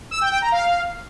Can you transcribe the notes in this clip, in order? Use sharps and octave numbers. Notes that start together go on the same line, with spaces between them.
E6
G5
G5
A#5
F5